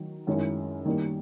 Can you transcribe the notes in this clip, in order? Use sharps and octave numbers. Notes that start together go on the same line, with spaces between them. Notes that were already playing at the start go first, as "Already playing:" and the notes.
Already playing: D#3 F#3
F#2 D#3 G#3 C#4 E4
D#3 G3 A#3